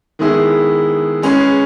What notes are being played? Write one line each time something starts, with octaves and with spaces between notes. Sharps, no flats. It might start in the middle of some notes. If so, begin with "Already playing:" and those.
D#3 G#3 B3 E4 G#4
G#3 C#4 G#4 B4